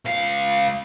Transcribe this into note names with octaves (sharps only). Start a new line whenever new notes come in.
C#2 F5